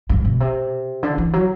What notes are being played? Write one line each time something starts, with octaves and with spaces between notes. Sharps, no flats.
G2
B2
C3
D3
E3
F#3